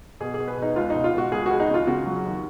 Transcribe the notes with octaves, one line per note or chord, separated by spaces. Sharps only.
B2 G#4
B2 G#4
B4
B2 D#4
C#2 F4
D#4
B2
F4
B2 F#4
C#2 G#4
C#2 F#4
D#4
C#3 F4
C#3 F#4
F#3
D#2